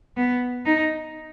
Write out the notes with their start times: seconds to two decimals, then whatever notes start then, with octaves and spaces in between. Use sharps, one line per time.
0.17 B3
0.66 D#4